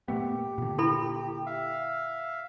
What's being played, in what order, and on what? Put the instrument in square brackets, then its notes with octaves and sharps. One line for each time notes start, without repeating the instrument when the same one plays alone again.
[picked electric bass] A#2 A3 B3 [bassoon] G4
[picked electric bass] A#2 D3
[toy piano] E4 A4 B5
[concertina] E5 F5